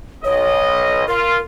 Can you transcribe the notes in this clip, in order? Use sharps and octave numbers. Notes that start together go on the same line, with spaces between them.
B1 C#5 D#5
F4 A#4